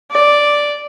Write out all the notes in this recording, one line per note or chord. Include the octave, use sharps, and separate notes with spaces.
D5